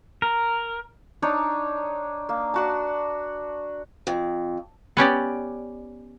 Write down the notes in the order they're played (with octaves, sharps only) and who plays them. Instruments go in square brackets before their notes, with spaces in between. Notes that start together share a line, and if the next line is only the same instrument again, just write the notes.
[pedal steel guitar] A#4
[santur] D4 D#4 C#5
A#3
D4 F#4 A5
[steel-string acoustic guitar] F2
[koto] B3 C#4 G4 D5